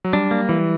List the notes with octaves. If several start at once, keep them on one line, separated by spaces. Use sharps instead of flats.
F#3
G3 D4
A#3
E3